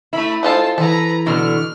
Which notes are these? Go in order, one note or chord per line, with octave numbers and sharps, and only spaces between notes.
A3 E4 B5
G#3 F4 A4 C5 A5
E3 A4 B4 A#5
B2 D3 F6